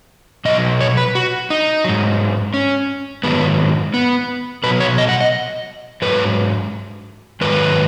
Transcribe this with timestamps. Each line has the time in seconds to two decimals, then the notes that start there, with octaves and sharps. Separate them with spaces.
0.45 B2 F#3 D#5
0.81 C#5
0.97 B4
1.15 F#4
1.50 D#4
1.84 G#2 F#3
2.54 C#4
3.23 G#2 D#3 F#3 B3
3.94 B3
4.64 B2 F#3 B4
4.80 C#5
4.98 D#5
5.09 F#5
5.21 D#5
6.02 G#2 D#3 F#3 B4
7.41 G#2 D#3 F#3 B4